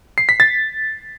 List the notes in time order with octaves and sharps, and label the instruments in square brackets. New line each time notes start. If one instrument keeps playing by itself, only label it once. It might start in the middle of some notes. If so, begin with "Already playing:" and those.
[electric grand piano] C7
B6
A6